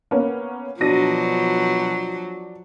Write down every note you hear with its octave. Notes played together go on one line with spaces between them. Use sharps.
A#3 B3 C#4
B2 F3 F#3 D4 A#6 D#7